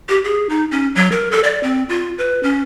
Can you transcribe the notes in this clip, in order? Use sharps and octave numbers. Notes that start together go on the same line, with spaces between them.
G4
G#4
D#4
C#4
F#3
A#4
A4
D5
C4
F4
B4
C#4